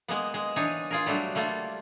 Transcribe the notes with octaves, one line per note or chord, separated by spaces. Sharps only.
G#3 A#3 B3
G#3
E3 D4 D#4 C#5
F4 G#4 A#4
F#3 G3 A3 D4
G3 A3 A#3 F4